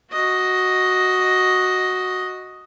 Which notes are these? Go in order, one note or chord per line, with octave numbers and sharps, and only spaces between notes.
F#4 D#5